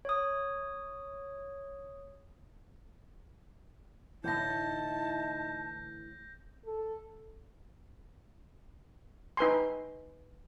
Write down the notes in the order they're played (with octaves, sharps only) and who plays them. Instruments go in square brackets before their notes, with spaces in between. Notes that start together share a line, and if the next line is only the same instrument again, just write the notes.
[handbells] C#5 D#6
[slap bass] A2 D3 E3 [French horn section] D#4 E4 [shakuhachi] A5 [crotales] G6 A#6
[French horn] A4
[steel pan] D#4 B4 G#5 C6